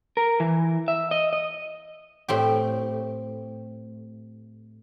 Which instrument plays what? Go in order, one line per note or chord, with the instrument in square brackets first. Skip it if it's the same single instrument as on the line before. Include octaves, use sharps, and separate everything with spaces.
[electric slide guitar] A#4
E3
E5
D#5
D#5
[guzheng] A2 C4 G4